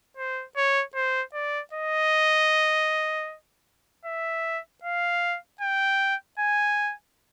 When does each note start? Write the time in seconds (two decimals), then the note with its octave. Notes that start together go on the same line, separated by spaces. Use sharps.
0.17 C5
0.56 C#5
0.95 C5
1.33 D5
1.73 D#5
4.05 E5
4.83 F5
5.61 G5
6.39 G#5